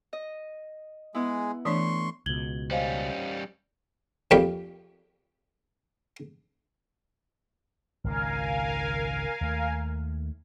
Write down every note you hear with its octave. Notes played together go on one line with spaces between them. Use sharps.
D#5
G#3 B3 E4 G#4
E3 A3 D4 C#5 C6 C#6
C#2 B2 G#6 F#7 G7
G3 C#4 C5 D#5 F5
F2 G3 A#3 G4
G#1 C#2 B2 A#4 F5 G#5
D#2 A3